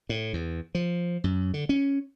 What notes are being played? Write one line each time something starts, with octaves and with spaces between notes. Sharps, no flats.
A2
E2
F3
F#2
D3
C#4